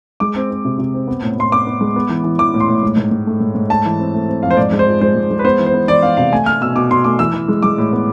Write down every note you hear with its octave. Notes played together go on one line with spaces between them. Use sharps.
G#3 D6
C4
C4
C3
C3
C4
B3
A2
A2 C6
B3 D6
B3
G#3
B3
E3
E3
E3 D6
A2
C6
A2
G#2
G#2
G#2
A3
G#2
G#2
A3 A5
E3
C4
A3
C4
F2 F5
C5
G#2 D5
G#3
C5
F3
G#3 C5
G#2
G#3
B4
B3 C5
E3
C5
B3
E3 D5
B3 F5
C3 F5
A3 G#5
A3 F6
B2 E6
B2 D6
B2 C6
A3 D6
E3 E6
E3
G#3
G#3 D6
A2
B3